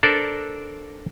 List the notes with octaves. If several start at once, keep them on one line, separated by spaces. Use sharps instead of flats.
D4 A4 A#4 C5 D5